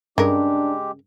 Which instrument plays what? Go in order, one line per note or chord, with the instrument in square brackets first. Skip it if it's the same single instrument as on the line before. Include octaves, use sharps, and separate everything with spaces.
[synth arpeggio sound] G2 [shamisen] C#3 A#4 [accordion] G#3 G4 [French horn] D4